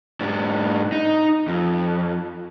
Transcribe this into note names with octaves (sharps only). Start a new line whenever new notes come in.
G#2 D4
D#4
F2